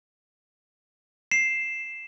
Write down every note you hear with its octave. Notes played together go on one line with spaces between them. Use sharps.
C7 E7